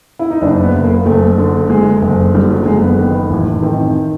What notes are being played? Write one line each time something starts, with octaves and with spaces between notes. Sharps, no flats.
E4
D#4
F#1 D4
B3
F#1
A#3
F#1 A3
D3
D3 G#3
F#1
D3 G3
F#3
F#1 G#3
B3
D#3
A1
D#3 C4